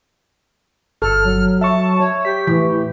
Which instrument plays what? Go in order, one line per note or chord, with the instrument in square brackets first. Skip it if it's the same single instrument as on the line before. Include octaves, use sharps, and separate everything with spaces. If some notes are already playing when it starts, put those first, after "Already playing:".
[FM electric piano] G1 [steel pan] A4 [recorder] F6
[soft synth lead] F#3
[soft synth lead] F#3 [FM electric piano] E5 C#6 [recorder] A5
[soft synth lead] C#5
[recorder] G4 [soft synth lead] B6
[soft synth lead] A2 [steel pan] E3